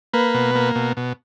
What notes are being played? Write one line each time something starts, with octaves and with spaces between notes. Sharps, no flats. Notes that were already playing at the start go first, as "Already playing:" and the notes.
A#3 B4
B2
A#3
B2
B2